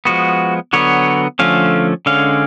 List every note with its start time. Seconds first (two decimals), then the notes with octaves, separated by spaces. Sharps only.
0.05 F3 G#3 B3 F#4
0.73 D3 F#3 B3 C#5
1.39 D3 F3 A3 C#4 F5
2.06 D3 G#3 C#4 F5